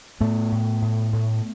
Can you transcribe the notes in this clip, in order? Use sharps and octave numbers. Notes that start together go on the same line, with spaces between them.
A2 A3 B3
A2
A2
A2